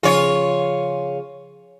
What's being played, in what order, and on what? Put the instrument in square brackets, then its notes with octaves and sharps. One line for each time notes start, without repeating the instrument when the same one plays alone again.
[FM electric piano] C#3 F3 G#4 [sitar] F4 C#5